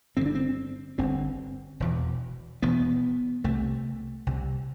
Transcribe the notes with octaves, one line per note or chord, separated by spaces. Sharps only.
G1 G2 D3 C4
D4
C4
G1 G2 D3 C4
E1 E2 B2
E1 E2 B2 B3
C2 C3 A3
C2 C3